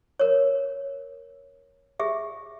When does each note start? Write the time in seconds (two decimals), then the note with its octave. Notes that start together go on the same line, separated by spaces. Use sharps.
0.20 A#4 C#5
2.00 G4 G#4 E5